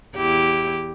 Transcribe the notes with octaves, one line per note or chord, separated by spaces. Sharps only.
E2 E4 G4